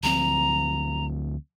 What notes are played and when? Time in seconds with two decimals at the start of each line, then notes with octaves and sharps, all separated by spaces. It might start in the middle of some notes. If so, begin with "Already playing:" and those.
0.03 D2 F3 C4 A#5